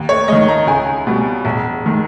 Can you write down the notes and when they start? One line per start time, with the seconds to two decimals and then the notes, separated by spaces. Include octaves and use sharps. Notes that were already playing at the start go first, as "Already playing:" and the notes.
Already playing: D#2
0.09 C#5
0.28 D#3 G#3 D#5
0.48 A#5
0.67 C#2 G#5
1.07 B2 G3
1.45 E1
1.86 D#3 G#3